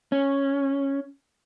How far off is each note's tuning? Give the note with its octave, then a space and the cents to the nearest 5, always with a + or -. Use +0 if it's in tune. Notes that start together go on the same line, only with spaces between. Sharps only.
C#4 -5